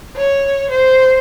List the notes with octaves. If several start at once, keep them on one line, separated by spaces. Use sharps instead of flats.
C#5
C5